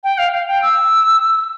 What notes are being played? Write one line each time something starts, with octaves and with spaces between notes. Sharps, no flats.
G5
F5
F5
G5
E6